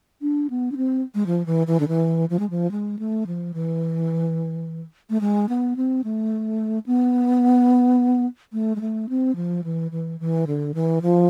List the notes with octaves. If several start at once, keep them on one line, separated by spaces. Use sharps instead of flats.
D4
B3
D4
C4
G#3
F3
E3
E3
D3
E3
F3
G#3
F3
G#3
A3
F3
E3
A3
G#3
B3
C4
A3
B3
A3
G#3
A3
C4
F3
E3
E3
E3
D3
E3
F3